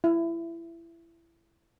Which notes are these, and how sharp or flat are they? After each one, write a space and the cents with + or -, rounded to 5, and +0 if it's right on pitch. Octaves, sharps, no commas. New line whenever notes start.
E4 +20